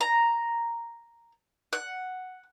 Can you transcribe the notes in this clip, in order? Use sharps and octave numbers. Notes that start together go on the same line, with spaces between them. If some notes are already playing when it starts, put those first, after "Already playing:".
A#5
F#5